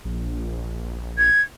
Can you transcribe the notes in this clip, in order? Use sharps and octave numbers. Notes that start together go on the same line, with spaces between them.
A#1
G#6